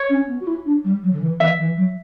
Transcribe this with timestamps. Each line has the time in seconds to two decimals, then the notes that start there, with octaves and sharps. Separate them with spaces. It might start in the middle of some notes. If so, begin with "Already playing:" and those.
Already playing: C#5
0.09 C#4
0.27 B3
0.40 F#4
0.47 E4
0.65 D4
0.84 G3
1.03 F#3
1.12 D3
1.21 E3
1.40 E3 E5
1.59 E3
1.77 F#3